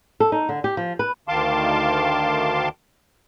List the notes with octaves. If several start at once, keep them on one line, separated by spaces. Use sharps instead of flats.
A4
D#4
D3
G4
F3
B4
D2 D#3 F5 A5 C6 D6